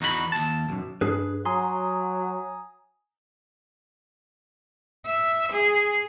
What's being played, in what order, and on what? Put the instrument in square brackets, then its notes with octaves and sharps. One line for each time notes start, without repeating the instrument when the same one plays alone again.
[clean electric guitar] E2 D#4 F#4 B4 B5
D#2 A5
B1 F#2
[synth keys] G2 [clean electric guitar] D4 G#4 B4
[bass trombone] F#3 [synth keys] G#5 A#5 D#6 [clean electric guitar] C6
[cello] E5
G#4